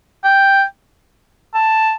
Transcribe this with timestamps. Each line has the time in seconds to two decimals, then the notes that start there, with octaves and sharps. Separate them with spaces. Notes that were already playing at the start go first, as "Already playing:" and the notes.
0.24 G5
1.54 A5